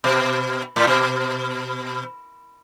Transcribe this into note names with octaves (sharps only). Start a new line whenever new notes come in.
B2
A2
B2